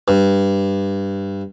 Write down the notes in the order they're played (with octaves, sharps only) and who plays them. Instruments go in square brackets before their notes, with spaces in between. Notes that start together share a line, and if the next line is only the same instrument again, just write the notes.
[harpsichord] G2